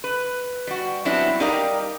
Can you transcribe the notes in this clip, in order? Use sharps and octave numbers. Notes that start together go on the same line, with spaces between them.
B4
G3 F#4
F#3 G3 B3 C4 D4 E4
G3 D#4 G4 A#4 D5 F5